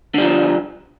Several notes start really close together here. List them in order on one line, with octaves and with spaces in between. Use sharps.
D3 G3 F3